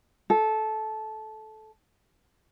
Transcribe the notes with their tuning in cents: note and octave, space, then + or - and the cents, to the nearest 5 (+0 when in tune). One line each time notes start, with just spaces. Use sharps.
A4 -15